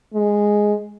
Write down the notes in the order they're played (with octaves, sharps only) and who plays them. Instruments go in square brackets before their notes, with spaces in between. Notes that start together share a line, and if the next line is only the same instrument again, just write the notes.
[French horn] G#3